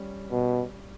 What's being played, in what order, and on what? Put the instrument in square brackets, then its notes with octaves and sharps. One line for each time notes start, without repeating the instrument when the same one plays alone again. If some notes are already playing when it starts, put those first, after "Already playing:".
Already playing: [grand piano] G3 C#4
[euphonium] B2